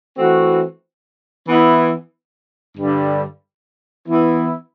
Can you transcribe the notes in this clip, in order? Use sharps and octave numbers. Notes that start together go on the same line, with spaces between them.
E3 A3 C4 F#4
E3 B3 E4
G2 D3 G3
E3 B3 E4